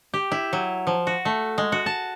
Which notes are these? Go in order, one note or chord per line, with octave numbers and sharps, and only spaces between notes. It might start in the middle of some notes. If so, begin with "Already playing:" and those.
G4
E4
F#3
F3
F#4
A3
G#3
F#4
A5